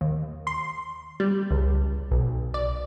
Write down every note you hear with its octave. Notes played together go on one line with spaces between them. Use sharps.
D#2
C6
G3
C#2
B1
D5